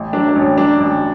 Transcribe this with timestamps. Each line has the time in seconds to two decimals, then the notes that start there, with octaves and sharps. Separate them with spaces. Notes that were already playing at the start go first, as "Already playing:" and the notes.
Already playing: A1
0.13 F#3 D4
0.29 D4
0.35 A1 C#4
0.58 F#3 D4
0.80 A1